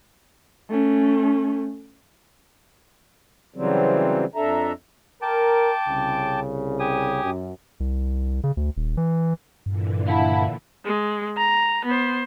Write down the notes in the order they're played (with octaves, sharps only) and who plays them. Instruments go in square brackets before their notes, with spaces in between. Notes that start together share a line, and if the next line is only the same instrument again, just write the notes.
[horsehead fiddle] A3 C#4
[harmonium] C#3 E3 F#3 G3 C4
F2 D4 A4 E5 A#5
[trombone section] A#4 [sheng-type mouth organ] G5 A5 D6
[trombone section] C2 C#3
[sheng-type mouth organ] G4 G#5 D#6
[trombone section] F#2
[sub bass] C2
C#3
D2
D#1
E3
[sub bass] G2 [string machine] A#2 D3 E3
[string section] E4 [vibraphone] F5 F#5 A5
[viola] G#3
A#5
B3 C5